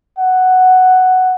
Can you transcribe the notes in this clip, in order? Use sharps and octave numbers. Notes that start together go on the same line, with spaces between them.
F#5